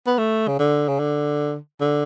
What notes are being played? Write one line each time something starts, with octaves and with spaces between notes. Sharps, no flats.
B3
A3
C#3
D3
C#3
D3
D3